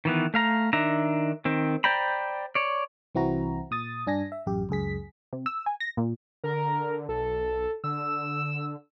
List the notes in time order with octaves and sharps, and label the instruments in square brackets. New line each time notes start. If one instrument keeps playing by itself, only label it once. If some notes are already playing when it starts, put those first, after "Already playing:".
[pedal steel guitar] D#3 E3 B3
A3 F5 A#5
D#3 D4 E5 A#5
D#3 C4
C5 D5 G5 A#5 B5
C#5 D5
[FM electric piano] C2 E3 C4 E4 F#4 A#5
A#2 D#6 A6
G2 D4 G#5 A#6
E5
A1 F#2 G4
C#2 F#2 G#4 B6
[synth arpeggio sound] C3
E6
G#5
A#6
A#2
[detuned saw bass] D3 [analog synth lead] A#4
[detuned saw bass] B1 [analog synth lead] A4
[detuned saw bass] D3 [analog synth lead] E6